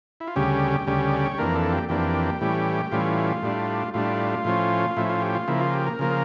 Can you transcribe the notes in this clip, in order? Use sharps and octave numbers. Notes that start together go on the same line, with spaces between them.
E4
F4
D2 C#3 G3 C#4 G4
D2 C#3 G3 C#4
D5
C#5
F2 E3 A#3 D4 A#4
A4
G4
F2 E3 A#3 D4 G4
A2 E3 G3 C#4
A2 E3 G3 C#4 F4
A2 G3 D4
A2 G3 D4 F4
A2 F3 C#4
A2 F3 C#4 E4
F4
G4
F4
C#3 F3 A#3 E4
F4
G4
A#4
C#3 F3 A#3